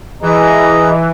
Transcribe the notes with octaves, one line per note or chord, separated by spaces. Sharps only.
E3 G#4 D#5 A#5